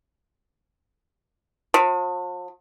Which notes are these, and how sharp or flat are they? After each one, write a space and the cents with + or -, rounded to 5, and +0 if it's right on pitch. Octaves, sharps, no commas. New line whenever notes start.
F3 +45